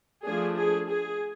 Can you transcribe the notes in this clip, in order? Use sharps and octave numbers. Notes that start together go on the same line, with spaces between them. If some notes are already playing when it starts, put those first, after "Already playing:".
F3 A3 D4 G#4
G#4
G#4